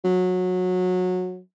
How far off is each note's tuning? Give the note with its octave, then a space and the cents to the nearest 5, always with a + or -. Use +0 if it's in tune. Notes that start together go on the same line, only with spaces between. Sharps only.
F#3 -20